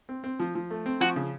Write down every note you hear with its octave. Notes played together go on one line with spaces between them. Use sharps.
C4
C4
F3
F3
A3
C4
F3 F#4
C#3